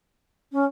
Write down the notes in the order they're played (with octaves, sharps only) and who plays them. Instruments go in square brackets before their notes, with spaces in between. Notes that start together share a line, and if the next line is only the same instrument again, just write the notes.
[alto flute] C#4